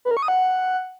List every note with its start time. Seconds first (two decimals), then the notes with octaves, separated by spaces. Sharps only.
0.05 B4
0.11 A#4
0.17 C#6
0.22 D#6
0.28 F#5